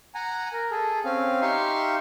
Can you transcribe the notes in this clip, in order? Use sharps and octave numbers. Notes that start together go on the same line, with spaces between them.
F#5 G#5 A#5
A#4
G#4 A4
C4 C#4 F5
D#4 G4 E5 F5 C6 C#6